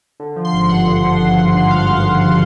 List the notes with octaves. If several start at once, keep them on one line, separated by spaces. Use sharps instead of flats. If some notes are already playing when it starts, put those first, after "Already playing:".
D3
F3
C6
G#1
G2 F#5
D3
F3
G#1
G2
D3
F3 F5
G#1